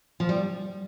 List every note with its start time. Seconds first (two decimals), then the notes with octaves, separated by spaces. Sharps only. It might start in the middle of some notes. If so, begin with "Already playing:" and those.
0.20 F3
0.29 G3